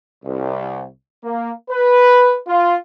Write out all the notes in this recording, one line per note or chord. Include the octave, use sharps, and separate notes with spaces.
C2
A#3
B4
F4